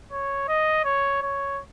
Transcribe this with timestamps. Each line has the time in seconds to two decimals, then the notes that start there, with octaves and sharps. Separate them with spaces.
0.12 C#5
0.49 D#5
0.85 C#5
1.22 C#5